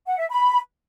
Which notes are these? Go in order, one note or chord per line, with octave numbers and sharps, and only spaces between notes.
F#5
E5
B5